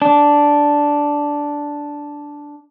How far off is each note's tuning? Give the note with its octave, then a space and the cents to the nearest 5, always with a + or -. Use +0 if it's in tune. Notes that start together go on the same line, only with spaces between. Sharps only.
D4 -5